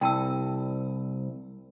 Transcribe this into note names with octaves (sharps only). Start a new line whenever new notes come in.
C2 G5 A5 E6